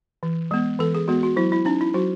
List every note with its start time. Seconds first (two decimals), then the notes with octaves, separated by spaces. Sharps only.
0.23 E3
0.51 G#3 B3
0.79 E3 A4
0.95 G#4
1.08 G#3 B3 F#4
1.23 F#4
1.36 F#3 E4
1.52 E4
1.65 C#4 D#4
1.81 E4
1.94 F#3 F#4